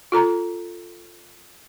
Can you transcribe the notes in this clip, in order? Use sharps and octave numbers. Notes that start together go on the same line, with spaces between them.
F4 A4 A#5